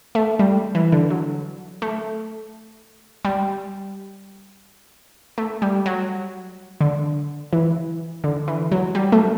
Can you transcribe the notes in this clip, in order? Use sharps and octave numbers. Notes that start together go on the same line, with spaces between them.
A3
G3
E3
D3
F#3
A3
G3
A3
G3
F#3
D3
E3
D3
E3
F#3
G3
A3